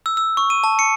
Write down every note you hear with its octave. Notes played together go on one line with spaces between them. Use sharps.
E6
E6
C#6
D#7
A5
C#7